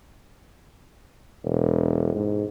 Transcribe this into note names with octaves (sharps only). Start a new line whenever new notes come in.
E1
G#2